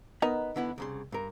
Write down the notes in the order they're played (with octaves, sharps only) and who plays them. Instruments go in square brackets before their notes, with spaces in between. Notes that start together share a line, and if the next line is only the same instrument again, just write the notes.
[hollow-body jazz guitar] B3 [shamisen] D#4 A#4 D#5
[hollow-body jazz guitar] D3 B3 E4
C2 C#3 C6
G2 A#4